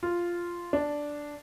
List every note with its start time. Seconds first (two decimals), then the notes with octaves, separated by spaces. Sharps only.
0.03 F4
0.73 D4